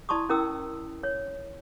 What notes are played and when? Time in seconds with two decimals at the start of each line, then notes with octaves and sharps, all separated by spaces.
0.09 E4 D5 A5 C6 C#6 D#6
0.29 C#4 E4 A#4 G5 D#6 E6
1.03 C#5